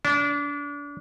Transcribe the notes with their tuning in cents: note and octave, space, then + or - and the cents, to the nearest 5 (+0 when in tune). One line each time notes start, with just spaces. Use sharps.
D4 -30